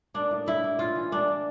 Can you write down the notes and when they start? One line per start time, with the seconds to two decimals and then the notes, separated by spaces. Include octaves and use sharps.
0.14 A#3 D4
0.31 A2
0.46 A2 E4
0.64 A#3
0.79 A2 F4
0.96 E3
1.12 A#3 D4
1.28 A#3